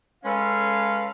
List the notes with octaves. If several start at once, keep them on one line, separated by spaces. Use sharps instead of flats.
G#3 C#4 A4 B4 F5